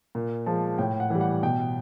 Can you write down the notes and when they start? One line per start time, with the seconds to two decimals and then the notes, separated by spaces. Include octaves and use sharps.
0.15 A#2
0.46 F3 G#3 A5
0.78 A2 G5
1.00 F#5
1.10 E3 G3
1.21 F#5
1.43 B2 G5